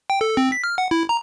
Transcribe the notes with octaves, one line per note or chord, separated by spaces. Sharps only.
G5
A4
C4
B6
F6
F#5
E4
A#5